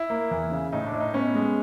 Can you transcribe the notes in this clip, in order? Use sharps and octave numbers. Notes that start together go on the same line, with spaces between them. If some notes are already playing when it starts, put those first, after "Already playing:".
Already playing: E4
A#3
E2
C#3
A2 D#4
D4
A2
D#4
B3 C#4
G#3